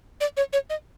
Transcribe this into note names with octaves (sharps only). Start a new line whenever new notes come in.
D5
C#5
C#5
D#5